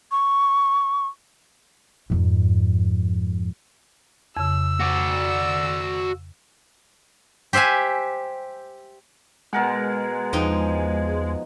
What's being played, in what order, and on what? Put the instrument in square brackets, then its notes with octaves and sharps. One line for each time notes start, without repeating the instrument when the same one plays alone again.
[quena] C#6
[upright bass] F2 G#2
[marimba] F2 C#3 [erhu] E6
[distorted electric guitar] F#4 D5
[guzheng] G4 C5 E5 F#5 G#5
[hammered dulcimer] B2 A#4 F#5 [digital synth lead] G#3
[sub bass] E2 [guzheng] F3 D#4 G5